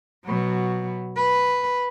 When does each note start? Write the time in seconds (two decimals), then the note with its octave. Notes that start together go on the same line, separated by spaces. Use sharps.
0.25 B2 F#3
1.16 B4